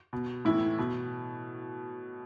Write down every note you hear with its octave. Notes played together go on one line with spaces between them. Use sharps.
B2
A2 E3 E4
B2